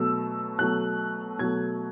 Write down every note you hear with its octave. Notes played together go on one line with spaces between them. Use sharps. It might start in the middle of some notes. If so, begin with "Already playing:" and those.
Already playing: B2 F#3 A3 E6
B2 F#3 A3 F#6
B2 F#3 A3 G#6